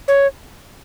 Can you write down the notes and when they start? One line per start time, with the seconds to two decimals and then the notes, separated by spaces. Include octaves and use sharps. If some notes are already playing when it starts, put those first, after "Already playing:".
0.08 C#5